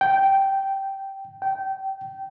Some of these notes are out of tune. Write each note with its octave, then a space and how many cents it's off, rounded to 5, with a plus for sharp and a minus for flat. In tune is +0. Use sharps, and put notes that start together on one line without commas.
G5 -10
G5 -20